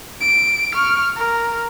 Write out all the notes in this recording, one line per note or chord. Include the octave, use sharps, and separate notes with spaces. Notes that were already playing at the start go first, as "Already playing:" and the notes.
D7
C#6 F6
A#4